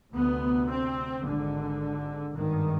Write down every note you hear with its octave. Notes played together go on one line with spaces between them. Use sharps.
D2 C3 B3
C4
G#1 G#2 D3
G#1 G2 D#3